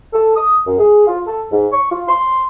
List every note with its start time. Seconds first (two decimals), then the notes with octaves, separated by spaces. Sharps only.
0.13 A4
0.35 D#6
0.66 F#2
0.78 G#4
1.07 F4
1.26 A4
1.51 G#2
1.72 C#6
1.91 F4
2.09 C6